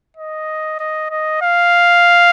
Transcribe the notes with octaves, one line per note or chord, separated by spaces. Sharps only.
D#5
D#5
D#5
F5